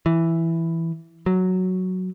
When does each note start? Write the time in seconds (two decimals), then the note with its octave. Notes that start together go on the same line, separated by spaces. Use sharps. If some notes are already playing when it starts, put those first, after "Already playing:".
0.06 E3
1.26 F#3